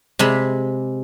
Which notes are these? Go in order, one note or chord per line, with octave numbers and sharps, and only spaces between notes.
C3 G#3 B5